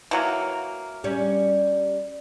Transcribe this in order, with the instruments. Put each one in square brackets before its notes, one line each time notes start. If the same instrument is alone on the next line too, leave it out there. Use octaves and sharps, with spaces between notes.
[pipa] E3 F#3 A#3
[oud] G3 C#4